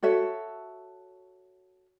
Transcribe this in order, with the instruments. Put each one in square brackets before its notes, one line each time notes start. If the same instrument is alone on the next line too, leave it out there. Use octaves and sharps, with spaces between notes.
[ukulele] F#4 A4 C#5 E5